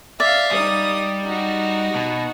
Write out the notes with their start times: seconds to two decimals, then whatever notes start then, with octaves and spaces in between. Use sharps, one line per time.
0.20 D5 E5 F5
0.52 G3 D#4 D#6
1.24 D#4 F#4
1.95 B2